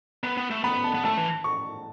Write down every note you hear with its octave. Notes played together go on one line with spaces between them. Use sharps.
B3 B5
B3
A3
B3 B5
A5
B3
A3 A5
E3
C#6